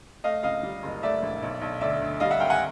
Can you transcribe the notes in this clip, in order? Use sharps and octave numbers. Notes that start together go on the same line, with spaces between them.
A3 D#5 F5
C#2 D#5 F5
G3
F#1
A3 D5 E5
A#1
B1
B1
D2 D5 E5
D2
G3 D#5 F5
E5 F#5
G#1 F5 G5
F#5 G#5